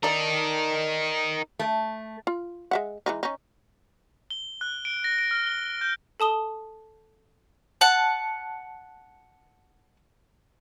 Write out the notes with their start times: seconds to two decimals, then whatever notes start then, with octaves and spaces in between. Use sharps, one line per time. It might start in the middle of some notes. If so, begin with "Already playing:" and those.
0.03 D#4 A4 A#4 D5
1.59 A3
2.27 F4
2.71 G#3 E5 F#5
3.06 E3 G#3 D#4
3.23 C#4 D#4
4.30 G7
4.61 F#6
4.85 D7
5.04 A#6
5.19 D7
5.31 F6
5.46 G7
5.81 G6
6.20 A4 A5 D#6 G7
7.81 F#5 A5